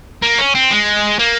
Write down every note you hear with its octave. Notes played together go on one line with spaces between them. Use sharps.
A#3
C#4
C4
G#3
A#3